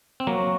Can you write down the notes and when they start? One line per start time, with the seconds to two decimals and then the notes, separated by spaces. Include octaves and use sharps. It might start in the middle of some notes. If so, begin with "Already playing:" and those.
0.20 C4
0.27 F#3 A#3 F#4